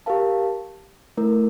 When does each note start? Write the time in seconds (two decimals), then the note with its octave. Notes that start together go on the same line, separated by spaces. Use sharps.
0.06 G4 A#4 F5 A5
1.17 A3 E4 A#4